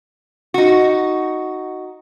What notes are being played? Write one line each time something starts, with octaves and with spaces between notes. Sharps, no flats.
D#4 F#4